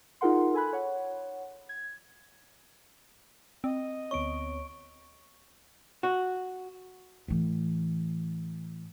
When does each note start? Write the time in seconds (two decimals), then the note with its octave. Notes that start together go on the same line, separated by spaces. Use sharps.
0.21 D#4 F4 G#4 A#4 F#5 C6
0.54 A4 G#5 B5 F#6
0.73 C#5 F#5
1.69 G#6
3.64 C4 D#5
4.11 D2 B3 C#5 C#6 D7
6.03 F#4
7.28 A2 E3